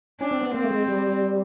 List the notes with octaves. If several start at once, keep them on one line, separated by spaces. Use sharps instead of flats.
C#4 D4
C4
B3
A#3 C4
A3
G#3
G3